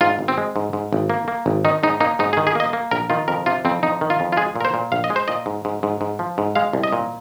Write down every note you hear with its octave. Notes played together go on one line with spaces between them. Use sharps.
G#2 F4
G#1
C4
G#3
G#2
G#2
G#1
A#3
A#3
G#1
D#3 D#4
G#2 D#4
A#3 D#4
G#2 D#4
G#4
D#3
G#4
A#3 D#5
A#3
A#1 A#4
D#3 F4
F2 A#4
C3 F4
F2 C4
F2 D#4
D#3
F4
F2
F4
G#3 G#4
A#2 A#4
C5
A#2
A#1 F5
D#5
G#3
C5
A#2 D#5
G#2
G#2
G#2
G#2
F3
G#2
G#3 F5
C2
D#5
A#2